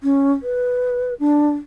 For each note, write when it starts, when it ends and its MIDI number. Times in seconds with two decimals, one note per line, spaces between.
0.03 0.31 61
0.43 1.14 71
1.20 1.52 62